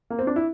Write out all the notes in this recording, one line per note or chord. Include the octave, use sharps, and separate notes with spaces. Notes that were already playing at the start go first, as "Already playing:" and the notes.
A#3
C4
D4
E4